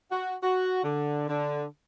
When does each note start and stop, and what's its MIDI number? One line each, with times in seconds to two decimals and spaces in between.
0.11 0.35 66
0.42 0.84 66
0.84 1.28 50
1.28 1.66 50